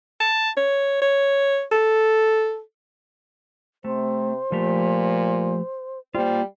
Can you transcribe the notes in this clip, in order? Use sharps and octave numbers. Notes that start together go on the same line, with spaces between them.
A5
C#5
C#5
A4
C3 A3 C5
A#2 F3 A3 G4
G3 A#3 F4 C5